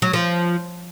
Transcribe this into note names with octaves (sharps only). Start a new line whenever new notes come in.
F#3
F3